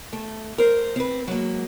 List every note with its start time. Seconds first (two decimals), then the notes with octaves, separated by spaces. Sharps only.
0.13 A3
0.58 A#4 C5
0.96 C4 B4
1.27 F#3 G#3 A#3